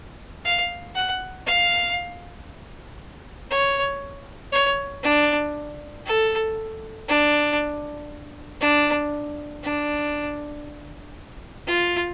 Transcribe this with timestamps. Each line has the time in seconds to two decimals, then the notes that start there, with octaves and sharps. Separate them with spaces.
0.45 F5
0.95 F#5
1.46 F5
3.50 C#5
4.52 C#5
5.03 D4
6.06 A4
7.08 D4
8.61 D4
9.63 D4
11.67 F4